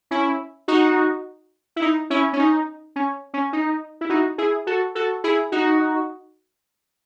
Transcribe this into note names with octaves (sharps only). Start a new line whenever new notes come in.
C#4 E4
D#4 F#4
E4
D#4
C#4 E4
C#4
D#4
C#4
C#4
D#4
E4
D#4 F#4
E4 G#4
F#4 A4
F#4 A4
E4 G#4
D#4 F#4